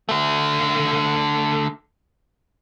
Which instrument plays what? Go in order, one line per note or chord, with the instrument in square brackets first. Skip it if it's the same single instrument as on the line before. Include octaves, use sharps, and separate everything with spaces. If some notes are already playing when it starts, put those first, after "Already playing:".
[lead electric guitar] D3 A3